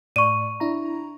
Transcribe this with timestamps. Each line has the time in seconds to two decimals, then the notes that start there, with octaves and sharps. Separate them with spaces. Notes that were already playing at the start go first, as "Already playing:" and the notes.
0.16 A2 D5 C#6 D#7
0.60 D4 E4 A#5